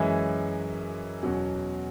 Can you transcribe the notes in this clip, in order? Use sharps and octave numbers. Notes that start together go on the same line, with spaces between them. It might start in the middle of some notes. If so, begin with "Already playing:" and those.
Already playing: F#2 E3 G#3 C#4 E4
E2 B2 F#3 C#4